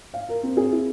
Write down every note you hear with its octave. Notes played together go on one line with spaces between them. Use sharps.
F5
A#4
C4
G#4
E4